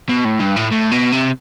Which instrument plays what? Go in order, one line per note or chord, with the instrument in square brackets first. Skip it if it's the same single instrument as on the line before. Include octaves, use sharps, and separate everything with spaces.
[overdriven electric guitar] B2
A2
G2
A2
A2
B2
C3